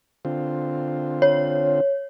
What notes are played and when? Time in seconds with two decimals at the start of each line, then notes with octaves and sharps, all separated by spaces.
0.25 D3 C4 F4
1.22 C#5